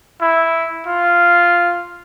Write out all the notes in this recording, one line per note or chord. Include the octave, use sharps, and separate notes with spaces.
E4
F4